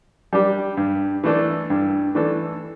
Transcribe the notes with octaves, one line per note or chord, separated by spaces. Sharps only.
G3 D4 G4
G2
E3 A3 D4 A4
G2
E3 A3 D4 A4